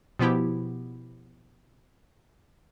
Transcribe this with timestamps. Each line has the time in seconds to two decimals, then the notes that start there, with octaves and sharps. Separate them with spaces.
0.19 B2 F3 B3 E4 G4